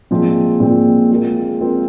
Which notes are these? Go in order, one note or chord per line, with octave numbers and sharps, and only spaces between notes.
A#2 F3 G#3 C4
A#2 F3 G#3 C4
G#3 C4 F4 A#4
G#3 C4 F4 A#4